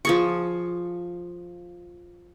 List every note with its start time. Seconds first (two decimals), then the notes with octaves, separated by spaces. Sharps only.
0.05 F3 G#4 C#6